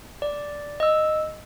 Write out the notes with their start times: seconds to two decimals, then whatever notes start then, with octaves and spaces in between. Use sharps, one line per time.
0.22 D5
0.80 D#5 E6